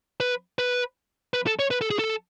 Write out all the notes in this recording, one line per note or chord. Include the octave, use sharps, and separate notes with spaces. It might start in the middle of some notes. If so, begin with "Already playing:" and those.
B4
B4
B4
A4
C#5
B4
A4
G#4
A4